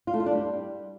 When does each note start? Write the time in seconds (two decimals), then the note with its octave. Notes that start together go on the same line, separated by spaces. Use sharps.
0.07 F4
0.14 A3
0.20 F4
0.26 D4
0.33 G3